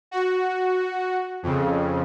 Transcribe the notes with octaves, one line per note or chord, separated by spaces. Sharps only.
F#4
F2 C#3